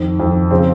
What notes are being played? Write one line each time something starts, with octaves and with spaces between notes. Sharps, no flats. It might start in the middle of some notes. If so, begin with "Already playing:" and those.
Already playing: F2 D#3
F2 D#3
C#3 F3 C4